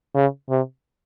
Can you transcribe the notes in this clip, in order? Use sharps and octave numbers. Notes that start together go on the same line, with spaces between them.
C#3
C3